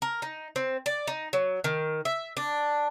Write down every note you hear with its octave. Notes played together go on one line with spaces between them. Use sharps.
A#4
D#4
C4
D5
D#4
F#3
D#3
E5
D4